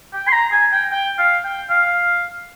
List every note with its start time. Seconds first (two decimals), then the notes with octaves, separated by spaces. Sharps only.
0.13 G5
0.27 C6
0.32 A#5
0.51 G#5
0.72 G5
0.91 G5
1.18 F5
1.44 G5
1.70 F5